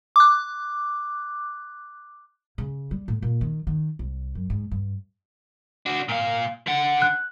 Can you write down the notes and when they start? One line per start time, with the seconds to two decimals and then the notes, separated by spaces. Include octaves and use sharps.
0.16 D6 F#6
2.58 C#3
2.91 G3
3.08 A2
3.22 A#2
3.41 D#3
3.67 D#3
3.99 C2
4.35 F#2
4.50 G#2
4.71 G2
5.86 D4 F#4
6.08 A#2 F5
6.67 D3 F#5
7.02 F#6